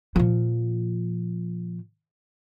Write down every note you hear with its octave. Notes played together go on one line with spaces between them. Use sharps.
A#2 F3